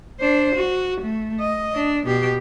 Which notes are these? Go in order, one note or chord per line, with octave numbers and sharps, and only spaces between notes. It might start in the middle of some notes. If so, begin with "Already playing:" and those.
D4 C5
F#4
A3
D#5
D4
B2 G4